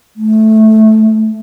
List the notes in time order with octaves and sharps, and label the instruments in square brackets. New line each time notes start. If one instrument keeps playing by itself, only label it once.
[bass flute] A3